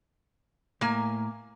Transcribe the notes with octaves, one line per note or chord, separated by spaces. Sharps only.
A2 A#3 G#5 A#5